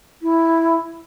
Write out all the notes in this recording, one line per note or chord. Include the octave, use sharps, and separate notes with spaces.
E4